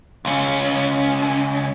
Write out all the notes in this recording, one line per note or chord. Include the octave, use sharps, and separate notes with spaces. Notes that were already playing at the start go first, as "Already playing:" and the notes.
C#2 C#4